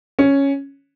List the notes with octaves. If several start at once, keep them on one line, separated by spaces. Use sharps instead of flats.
C#4